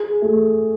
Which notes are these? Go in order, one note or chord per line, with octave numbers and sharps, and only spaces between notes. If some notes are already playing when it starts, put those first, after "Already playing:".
Already playing: G#4
A3